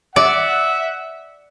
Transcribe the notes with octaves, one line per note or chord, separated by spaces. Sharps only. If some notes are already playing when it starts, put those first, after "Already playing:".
D5 E5 F#5